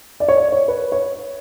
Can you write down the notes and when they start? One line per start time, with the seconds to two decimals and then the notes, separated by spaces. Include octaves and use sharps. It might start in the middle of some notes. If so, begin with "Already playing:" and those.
0.20 D5
0.28 C#5
0.37 D5
0.52 C#5
0.68 B4
0.92 C#5